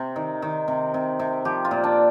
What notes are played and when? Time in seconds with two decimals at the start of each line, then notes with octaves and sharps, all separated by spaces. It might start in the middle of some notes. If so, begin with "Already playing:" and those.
Already playing: C3
0.16 D#3
0.42 D#3
0.68 C3
0.94 C3
1.19 C3
1.45 F3 G4
1.65 F4
1.71 A#2
1.84 D4